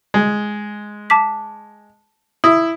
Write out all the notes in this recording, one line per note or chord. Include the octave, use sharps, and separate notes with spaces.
G#3
A5 D6 B6
E4 D#6